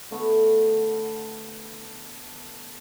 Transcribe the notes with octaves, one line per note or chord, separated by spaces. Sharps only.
D3 A3 B3